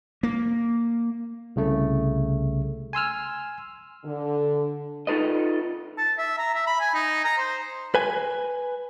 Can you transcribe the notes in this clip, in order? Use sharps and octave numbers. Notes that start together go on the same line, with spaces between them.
A#3
C2 C#3 A3
G#5 C6 E6 F6
D3
D#4 F4 A4 B4 D#5
A5
E5
A#5
E5
B5
G#5
D#4
A#5
C5
B4 G#5